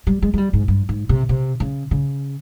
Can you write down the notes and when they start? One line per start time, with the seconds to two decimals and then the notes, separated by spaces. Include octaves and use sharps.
0.07 G3
0.22 G#3
0.34 G#3
0.38 G3
0.53 G#2
0.68 G2
0.89 G#2
1.09 C3
1.29 C3
1.60 C#3
1.91 C#3